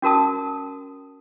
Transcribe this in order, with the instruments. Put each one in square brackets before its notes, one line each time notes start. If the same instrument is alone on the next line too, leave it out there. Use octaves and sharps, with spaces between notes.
[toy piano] C#4 F#4 A#4 A5 D#6